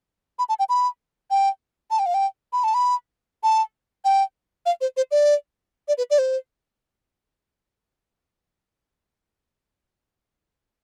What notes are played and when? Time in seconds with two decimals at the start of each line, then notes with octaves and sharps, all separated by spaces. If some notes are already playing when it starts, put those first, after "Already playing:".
0.39 B5
0.49 A5
0.59 G5
0.69 B5
1.30 G5
1.90 A5
1.99 G5
2.06 F5
2.14 G5
2.53 B5
2.63 A5
2.74 B5
3.43 A5
4.04 G5
4.66 F5
4.81 C5
4.97 C5
5.11 D5
5.88 D5
5.98 B4
6.10 D5
6.18 C5